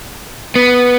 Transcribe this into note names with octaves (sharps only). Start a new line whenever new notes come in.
B3